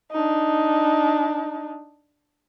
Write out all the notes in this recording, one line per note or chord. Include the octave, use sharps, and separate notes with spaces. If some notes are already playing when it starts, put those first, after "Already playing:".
D4 D#4